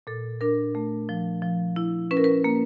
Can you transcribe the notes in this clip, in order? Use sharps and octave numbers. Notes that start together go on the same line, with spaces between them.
A#2 A4
D4 A#4
A3
F3
F3
E4
C#4 B4
A#4
B4
A#3